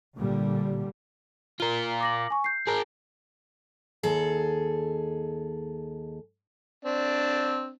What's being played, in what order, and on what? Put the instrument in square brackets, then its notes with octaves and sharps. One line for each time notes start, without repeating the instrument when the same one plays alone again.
[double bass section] A#2 D3 G3
[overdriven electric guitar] F4 A#4 [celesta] G7
[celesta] D6 A#6 F#7
G#5 C#6
G6 C7
[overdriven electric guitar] G#4 A#4
[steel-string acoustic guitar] D#2 G#4 A4
[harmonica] C4 D4